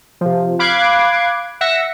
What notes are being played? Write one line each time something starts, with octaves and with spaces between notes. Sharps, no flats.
C3 F3
F5 B5 D6 F#6 G#6 C7
E5 F#5 A#6 C#7